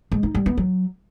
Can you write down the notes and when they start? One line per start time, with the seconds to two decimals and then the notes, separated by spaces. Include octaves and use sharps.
0.12 G#3
0.23 D#4
0.35 G3
0.46 B3
0.57 F#3